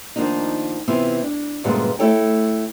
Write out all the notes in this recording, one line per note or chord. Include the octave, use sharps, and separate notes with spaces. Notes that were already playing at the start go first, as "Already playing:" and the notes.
D#3 F3 G#3 A#3 D4 D#4
C3 E3 B3 F4
D4
D2 G2 A#2 G#3 C#4 B4
A3 E4 A4 C#5 G5